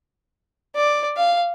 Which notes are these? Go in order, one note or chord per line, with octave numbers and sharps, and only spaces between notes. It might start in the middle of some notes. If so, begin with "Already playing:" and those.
D5
F5